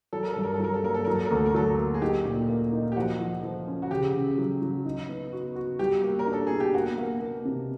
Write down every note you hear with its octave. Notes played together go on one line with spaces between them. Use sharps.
F#3 A4
A#4
G2 A4
A#4
A4
F#3 A#4
A4
A#3 A#4
A4
F#3 A#4
A4
A#4
D2 A4
A#4
F#3 A4
A#3
G#4
D#4 G4
A#2
A#3
D#4
G4
F3 F#4
F3
F3
C#4
F#4
C#3 G4
C#3
F#3
F#3
D#4
B3
F#4
F#4
G3 G4
A#3
A#4
D4
A4
B2 G#4
G4
A#3 F#4
A#3
A#3
C3